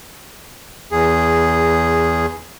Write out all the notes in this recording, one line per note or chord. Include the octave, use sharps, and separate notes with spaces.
E2 G#4